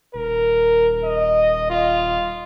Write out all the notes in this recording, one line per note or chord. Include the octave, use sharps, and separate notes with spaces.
D#1 A#4
D#5
F4